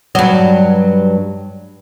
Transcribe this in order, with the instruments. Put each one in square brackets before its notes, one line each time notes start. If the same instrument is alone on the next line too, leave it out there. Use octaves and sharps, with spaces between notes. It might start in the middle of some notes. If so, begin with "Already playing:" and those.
[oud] G2 F#3